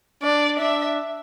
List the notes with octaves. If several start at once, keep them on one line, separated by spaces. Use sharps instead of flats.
D4 D5
D4 E5